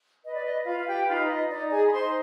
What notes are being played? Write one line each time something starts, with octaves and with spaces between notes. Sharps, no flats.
B4 D#5
D5
D#5
F4 B4 F5
F5
G4 G5
D#4 F4 F5
D#5
D#4 D5
G#4 G#5
B5
D#4 C5 C6